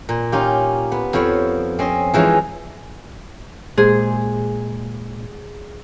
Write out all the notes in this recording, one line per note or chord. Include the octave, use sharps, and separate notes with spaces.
A#2
C#4 D#4 F4 G4
B3
F2 F3 C#5 B5
C4 C#4 D#5
E3 F3 G#3 C#4 D#4
A#2 G#3 G#4 C5